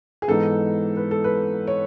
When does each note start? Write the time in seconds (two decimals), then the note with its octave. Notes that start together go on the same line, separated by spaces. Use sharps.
0.22 G#4
0.28 G#2 E3 B3 D#4 A4
0.97 B4
1.11 A4
1.24 B4
1.67 C#5